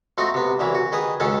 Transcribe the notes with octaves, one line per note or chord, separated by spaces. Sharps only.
A3 C4 D#4 F4 F#4
C3 B3
C2 E3 F#3 B5
F#4
D#3 G#4 B4 D#6
C#2 F#2 D#3 C#4 A4 A5